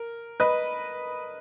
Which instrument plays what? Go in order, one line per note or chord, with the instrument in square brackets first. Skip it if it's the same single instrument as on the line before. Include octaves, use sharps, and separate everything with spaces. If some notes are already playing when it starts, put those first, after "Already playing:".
Already playing: [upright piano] A#4
B4 D#5